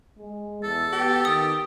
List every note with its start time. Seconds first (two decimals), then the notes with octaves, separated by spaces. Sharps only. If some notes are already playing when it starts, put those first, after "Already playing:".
0.18 G#3
0.63 E2 A4
0.93 B3 G4
1.25 D#3 D#6